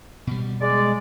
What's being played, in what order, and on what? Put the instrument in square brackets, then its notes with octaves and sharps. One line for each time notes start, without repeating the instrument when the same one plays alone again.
[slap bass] B2 G3
[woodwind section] G#3 D5